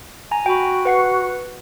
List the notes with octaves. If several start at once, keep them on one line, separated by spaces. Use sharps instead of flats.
G#5 A#5
F#4 G5 B5
B4 F#5 C7